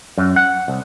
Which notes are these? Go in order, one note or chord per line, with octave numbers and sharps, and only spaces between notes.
F#2
F#5
C2